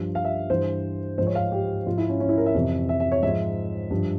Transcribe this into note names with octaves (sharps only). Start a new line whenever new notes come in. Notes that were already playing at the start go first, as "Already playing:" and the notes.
Already playing: G2 F3
F5
E5
G2 E3 C5
G#2 F3 C5
C#5
F5
G4
G#2 F3 F4
E4
C#4
C#4
E4
A#4
E5
F2 C3 E3
E5
E5
C#5
G#2 F3 E5
G2 F3